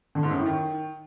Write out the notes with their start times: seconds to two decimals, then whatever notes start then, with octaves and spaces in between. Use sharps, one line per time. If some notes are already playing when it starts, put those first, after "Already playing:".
0.15 D3
0.23 G#2
0.31 F#2
0.38 A2
0.46 D#3